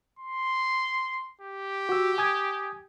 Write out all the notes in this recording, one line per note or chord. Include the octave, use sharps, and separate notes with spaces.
C6
G4
F#4 E6
G#5 D#6 G#6